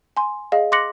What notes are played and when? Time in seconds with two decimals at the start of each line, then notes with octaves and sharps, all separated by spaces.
0.17 G#5 C6
0.52 G#4 D#5 F5
0.72 C6 D6 F#6 A#6 C#7 F#7